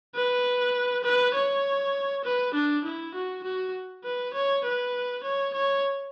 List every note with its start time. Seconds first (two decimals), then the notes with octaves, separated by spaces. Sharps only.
0.15 B4
1.04 B4
1.35 C#5
2.25 B4
2.54 D4
2.85 E4
3.14 F#4
3.44 F#4
4.05 B4
4.34 C#5
4.65 B4
5.24 C#5
5.54 C#5